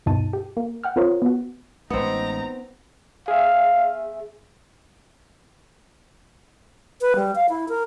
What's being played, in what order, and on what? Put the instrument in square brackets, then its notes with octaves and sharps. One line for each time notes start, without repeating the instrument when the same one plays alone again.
[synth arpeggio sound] D2 G2 B2 D#4 A5 D#7
G4
A#3
F#5 G5 F6
C4 F4 A#4 C5 C#5
B3 F#4
[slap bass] A1 G#3 [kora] B3 C4 [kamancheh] D#4 A#5
[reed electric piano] G#4 E5 [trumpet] F5
[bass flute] B4
G3
F5
E4
A#4